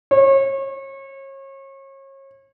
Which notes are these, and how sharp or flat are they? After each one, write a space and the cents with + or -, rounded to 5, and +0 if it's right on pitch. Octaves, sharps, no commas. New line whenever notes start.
C#5 -35